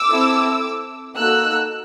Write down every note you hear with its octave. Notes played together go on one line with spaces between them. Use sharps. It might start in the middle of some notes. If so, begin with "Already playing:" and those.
Already playing: D6 E6
C4 E4 A4
A#3 D#4 F#4 A4 E6 F#6